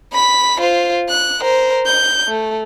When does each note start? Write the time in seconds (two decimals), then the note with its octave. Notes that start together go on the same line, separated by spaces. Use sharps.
0.12 B5 B6
0.61 F4 C5
1.09 F#6
1.40 A#4 C5
1.86 G6
2.28 A3